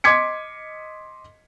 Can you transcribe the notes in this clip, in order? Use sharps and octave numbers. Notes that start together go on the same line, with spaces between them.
D#5 C6 D6 G#6 B6 C#7